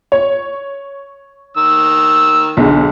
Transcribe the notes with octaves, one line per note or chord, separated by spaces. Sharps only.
C#5
D#3 E6
B1 D3 G#4